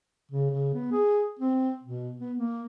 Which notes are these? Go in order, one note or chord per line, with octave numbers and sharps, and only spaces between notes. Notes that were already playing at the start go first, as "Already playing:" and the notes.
C#3
C#3
B3
G#4
C4
B2
B3
A#3